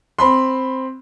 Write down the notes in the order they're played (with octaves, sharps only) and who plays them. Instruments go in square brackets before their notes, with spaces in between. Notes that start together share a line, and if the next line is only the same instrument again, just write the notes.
[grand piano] C4 B5 C6